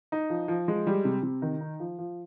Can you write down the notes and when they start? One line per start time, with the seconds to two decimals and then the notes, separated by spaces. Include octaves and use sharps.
0.12 D#4
0.30 F3
0.48 F3
0.68 G#3
0.87 G3
1.05 C3
1.23 C3
1.42 D#3
1.61 D#4
1.80 F3
1.98 F3